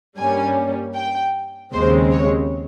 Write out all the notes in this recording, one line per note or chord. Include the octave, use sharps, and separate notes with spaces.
G2 G3 A#3 C#4 G#5
G5
D#2 C#3 G#3 C4 C5
C#5